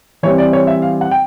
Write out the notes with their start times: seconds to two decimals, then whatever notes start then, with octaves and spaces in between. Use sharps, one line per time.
0.23 E3 G3 C4 C#5
0.38 D5
0.53 C#5
0.67 E5
0.82 F5
1.01 F#5
1.11 G5